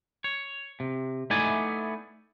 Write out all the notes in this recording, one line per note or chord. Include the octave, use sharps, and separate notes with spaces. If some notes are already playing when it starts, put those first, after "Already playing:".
C#5
C3
A3 B3 D#4 E4 D5 G#5